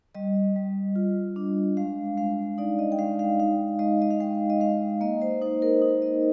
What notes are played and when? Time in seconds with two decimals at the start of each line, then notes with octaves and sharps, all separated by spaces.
0.15 G3 D#5
0.56 G3
0.96 F4
1.36 D4
1.77 G#3 F5
2.17 G#3 F5
2.58 D#4 D5
2.79 D#5
2.92 G5
2.99 G#3 F5
3.19 F5
3.39 D#4 F5
3.79 G#3 D#5
4.02 D#5
4.11 F5
4.20 G#3 G5
4.50 D#5
4.60 G#3 F5
5.01 A#3 D#5
5.22 C5
5.41 D#4 C5
5.62 A#4
5.82 D#4
6.02 D#5